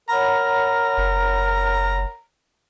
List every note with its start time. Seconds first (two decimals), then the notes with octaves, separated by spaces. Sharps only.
0.09 A#4 C#5 F#5 A#5 B5
0.97 F#1